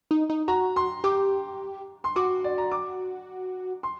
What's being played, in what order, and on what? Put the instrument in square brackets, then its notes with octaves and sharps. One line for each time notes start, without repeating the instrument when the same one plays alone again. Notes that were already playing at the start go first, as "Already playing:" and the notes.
[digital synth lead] D#4
D#4
[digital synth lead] F#4 [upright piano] A#5
[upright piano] C6
[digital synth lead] G4 [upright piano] D6
[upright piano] C6
[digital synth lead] F#4 [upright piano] D6
[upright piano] D5
A#5
D6
C6